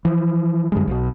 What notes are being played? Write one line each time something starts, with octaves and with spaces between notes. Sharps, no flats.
E3 F3
F#2 D3 G3 G#3
B1 B2